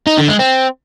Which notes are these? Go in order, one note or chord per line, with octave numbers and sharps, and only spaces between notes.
D#4
D3
G#3
C4